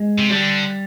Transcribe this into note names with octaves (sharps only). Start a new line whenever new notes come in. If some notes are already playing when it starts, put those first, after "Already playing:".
Already playing: G#3
C3
D3 G3